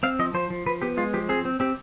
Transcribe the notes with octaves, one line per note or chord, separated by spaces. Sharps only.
C4 F5
F3 D#5
F3 C5
F3
F3 B4
B3 G4
G#3 F4
F3 G4
C4 G#4
C4
C4 G4